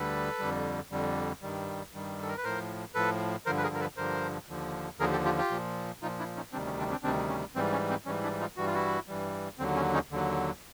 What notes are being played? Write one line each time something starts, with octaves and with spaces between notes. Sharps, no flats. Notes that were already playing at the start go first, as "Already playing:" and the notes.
Already playing: D2 D3 G3 A4 B4
F2 D3 G3
F2 D3 G3
G2 D#3 G3
G2 D#3 G3
A4
A#4
B4
A2 F3 A#4 C5
A2 F3 A4 B4
G2 D3 F3 A#4 C5
B4
G#4 A#4
A#4
A4 B4
G2 D3 F3 A#4 C5
D#2 D3 F3
D#2 D3 F3 G#4 A#4
G4 A4
F4 G4
F4 G4
A#2 F3
A#2 F3 D#4 F4
D4 E4
C#4 D#4
D2 C3 D#3 G3 C4 D4
C#4
C4 D4
C4 D4
D2 C3 D#3 G3 C4 D4
C#4
G#2 E3 G3 C4
C#4
C4
G#2 E3 G3 C#4
D4 E4
D#4 F4
G2 E3 G3 F#4
F4
E4 F#4
G2 E3 G3
D#2 D3 F#3 C4
C#4
C#4 D#4
D#2 D3 F#3